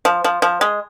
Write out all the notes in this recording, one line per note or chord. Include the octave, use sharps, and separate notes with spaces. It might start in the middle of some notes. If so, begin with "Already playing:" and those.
F3
F3
F3
G#3